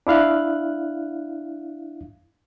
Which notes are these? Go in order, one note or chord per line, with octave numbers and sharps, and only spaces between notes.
D4 E4 F5 F#6